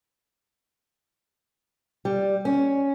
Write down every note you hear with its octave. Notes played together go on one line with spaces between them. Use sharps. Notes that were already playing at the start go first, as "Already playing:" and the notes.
G3
C#4